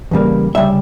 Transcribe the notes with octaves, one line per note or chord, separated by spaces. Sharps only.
E2 C#3 G3 A#3
D2 C#3 G3 E5